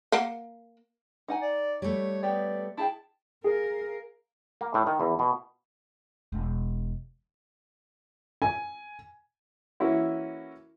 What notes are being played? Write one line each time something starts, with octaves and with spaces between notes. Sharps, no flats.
A#3 F5 F#5
D#4 F#5 G#5
D5
G3 A3 C#5
B3 G4 C#5 D5
E4 G#4 G5 A5
G#4 A#4 F5
A#3
A2
D#3
E2
B2
E1
G#5
E3 A#3 C#4 E4 F#4